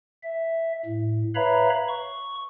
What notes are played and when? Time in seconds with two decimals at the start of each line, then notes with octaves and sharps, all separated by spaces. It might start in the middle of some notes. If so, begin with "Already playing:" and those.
0.23 E5
0.85 A2
1.35 B4 C#5 E5 F5 A#5 B5
1.89 C#6